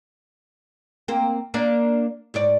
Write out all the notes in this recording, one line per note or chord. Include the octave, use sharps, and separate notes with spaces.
A#3 C4
A#3 D4 D5
G#2 C#5 D5